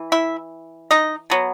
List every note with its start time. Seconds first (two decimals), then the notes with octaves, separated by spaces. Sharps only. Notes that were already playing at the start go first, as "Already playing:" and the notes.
Already playing: E3
0.12 E4 E5
0.91 D#4 D#5
1.30 B2 F#3 B3